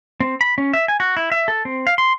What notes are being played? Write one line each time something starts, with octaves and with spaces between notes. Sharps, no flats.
C4
B5
C#4
E5
G#5
F#4
E4
E5
A4
C4
F5
C6